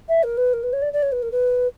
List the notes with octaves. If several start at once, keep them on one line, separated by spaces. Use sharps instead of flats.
E5
A#4
B4
A#4
B4
C#5
D5
D5
C#5
B4
A#4
B4